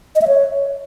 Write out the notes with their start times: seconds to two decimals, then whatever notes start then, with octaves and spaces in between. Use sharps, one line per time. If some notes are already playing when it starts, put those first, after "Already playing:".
0.16 D#5
0.22 E5
0.28 C#5